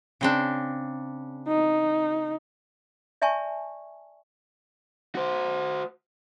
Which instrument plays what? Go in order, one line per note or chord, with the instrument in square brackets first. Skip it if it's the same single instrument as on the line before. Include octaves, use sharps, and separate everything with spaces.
[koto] C#3 C4 D4
[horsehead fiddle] D#4
[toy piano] D5 E5 G#5 A5 C#6
[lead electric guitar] F#4 C5